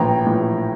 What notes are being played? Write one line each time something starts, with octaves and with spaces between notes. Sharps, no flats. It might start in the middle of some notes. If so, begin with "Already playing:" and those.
Already playing: A#1 A2 E3 G5 A#5
A#1 A2 E3